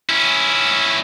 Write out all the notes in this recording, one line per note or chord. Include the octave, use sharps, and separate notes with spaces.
C#4 E4